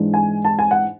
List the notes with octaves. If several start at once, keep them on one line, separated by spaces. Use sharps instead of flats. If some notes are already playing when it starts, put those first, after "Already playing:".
Already playing: G#2 E3 G#3 D4
G#5
A5
G#5
F#5